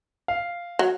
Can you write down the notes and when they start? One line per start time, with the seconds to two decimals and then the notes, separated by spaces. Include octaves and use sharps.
0.28 F5
0.79 F#3